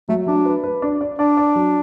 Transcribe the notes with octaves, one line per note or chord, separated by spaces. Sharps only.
F#3 A3
F#3 D4
B4
B4
D4
D5
D4 D5
D5
F#3